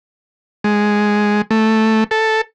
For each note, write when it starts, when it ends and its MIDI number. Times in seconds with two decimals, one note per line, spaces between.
0.64 1.42 56
1.51 2.04 57
2.11 2.41 69